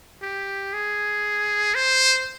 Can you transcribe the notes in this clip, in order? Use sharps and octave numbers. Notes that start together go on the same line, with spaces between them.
G4
G#4
C5